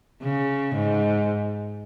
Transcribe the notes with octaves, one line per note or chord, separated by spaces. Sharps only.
C#3
G#2